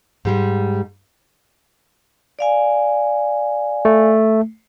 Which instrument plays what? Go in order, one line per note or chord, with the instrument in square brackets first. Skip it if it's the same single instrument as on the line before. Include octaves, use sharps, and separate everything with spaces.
[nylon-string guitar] G#2 G3 G#3
[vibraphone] D5 F5 G#5
[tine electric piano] A3